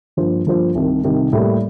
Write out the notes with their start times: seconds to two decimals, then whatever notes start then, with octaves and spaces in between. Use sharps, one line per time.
0.17 G2 F3 A#3 F4 C5
0.47 G2 F3 A#3 F4 C5
0.75 C2 C3 D#3
1.04 C2 C3 D#3
1.33 A2 G3 A#3